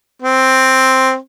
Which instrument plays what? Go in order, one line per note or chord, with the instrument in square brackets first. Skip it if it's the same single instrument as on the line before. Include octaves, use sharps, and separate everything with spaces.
[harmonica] C4